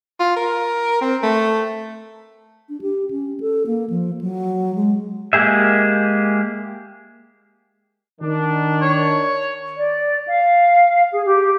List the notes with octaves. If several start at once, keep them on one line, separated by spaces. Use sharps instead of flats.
F4
A#4
C4
A3
D4
G4
C#4
A4
A#3
F3
F#3
G#3
G#3 A#3 G4 G#4 E5
D#3 D4
C#5
D5
F5
G#4
G4